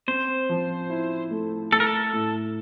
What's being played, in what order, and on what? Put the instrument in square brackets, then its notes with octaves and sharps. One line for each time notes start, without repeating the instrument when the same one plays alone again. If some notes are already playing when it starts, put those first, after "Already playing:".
[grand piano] C4 [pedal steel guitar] C5
[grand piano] F3
E4
A3
[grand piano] A3 [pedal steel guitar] A4
[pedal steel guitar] A#4
A4
[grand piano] A2